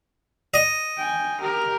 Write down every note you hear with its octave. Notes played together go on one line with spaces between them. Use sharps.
D#5
G5 G#5
G4 A#4